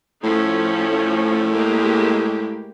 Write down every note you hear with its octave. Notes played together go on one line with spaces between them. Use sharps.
A2 F3 A3 C#4
G#3 A#3 G4